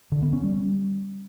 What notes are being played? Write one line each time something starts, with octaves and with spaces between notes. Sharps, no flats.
D3
B3
C#4
G3